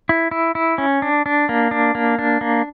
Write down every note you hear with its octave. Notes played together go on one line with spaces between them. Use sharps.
E4
E4
E4
C#4
D4
D4
A#3
D4
A#3
D4
A#3